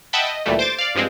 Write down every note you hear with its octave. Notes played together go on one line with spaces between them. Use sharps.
D#5 E5 F#5 G5 A5 B5
D#5
D2 A#2 E3 G3 A3
C5 D6 A6
D5 F5
G2 F3 G#3 C4